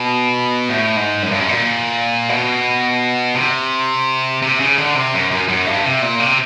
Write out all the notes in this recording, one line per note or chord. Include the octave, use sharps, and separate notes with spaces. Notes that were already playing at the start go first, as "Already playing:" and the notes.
Already playing: B2
A2
G#2
F#2
G2
F#2
A#2
B2
C3
C3
C#3
D3
C3
F#2
F#2
F#2
G2
C3
A#2
C3